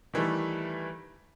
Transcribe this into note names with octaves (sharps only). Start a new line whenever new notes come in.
D#3 E3 G3 A3